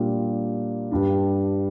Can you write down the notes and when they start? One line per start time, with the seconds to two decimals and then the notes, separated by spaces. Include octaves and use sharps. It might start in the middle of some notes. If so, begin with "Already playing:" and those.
Already playing: A#2 G3 A#3 D4
0.91 G2 G3 D4